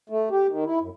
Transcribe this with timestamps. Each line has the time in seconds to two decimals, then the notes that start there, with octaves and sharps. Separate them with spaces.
0.09 A3
0.30 G4
0.48 D#3
0.64 E4
0.81 F#2